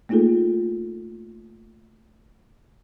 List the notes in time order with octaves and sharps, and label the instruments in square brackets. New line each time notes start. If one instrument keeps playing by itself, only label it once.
[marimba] A3 A#3 D#4 F4 G#4 A4